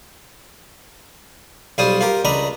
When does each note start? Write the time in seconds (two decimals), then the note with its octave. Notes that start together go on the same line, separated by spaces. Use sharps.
1.78 B1 G3 F4 C5 D#6
2.01 F4 G4 A#4
2.25 C#2 D4 D#5 A#5 B5